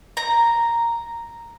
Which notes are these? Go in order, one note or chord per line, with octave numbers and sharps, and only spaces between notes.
A#5